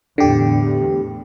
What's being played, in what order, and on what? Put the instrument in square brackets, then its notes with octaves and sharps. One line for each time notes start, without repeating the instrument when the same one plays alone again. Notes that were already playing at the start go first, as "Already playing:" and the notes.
[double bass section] E2 A2 [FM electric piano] D3 G4